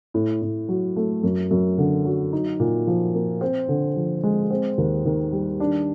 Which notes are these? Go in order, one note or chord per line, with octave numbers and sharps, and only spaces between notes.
A2
A2
F#3
A3
F#2
F#2
D3
F#3
D#4
A#2
F3
A#3
C4
D3
F3
G#3
C4
D#2
D#3
G3
D4